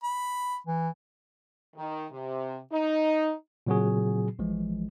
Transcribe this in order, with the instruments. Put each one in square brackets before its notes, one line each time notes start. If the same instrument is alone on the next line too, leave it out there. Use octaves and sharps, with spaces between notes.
[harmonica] B5
[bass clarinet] E3
[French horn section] D#3
C3
D#4
[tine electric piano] A#2 C#3 F#3 C4 F#4 G#4
A1 E3 F3 G#3